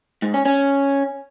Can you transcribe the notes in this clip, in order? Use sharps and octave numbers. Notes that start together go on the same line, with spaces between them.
G#2
C#4
C#4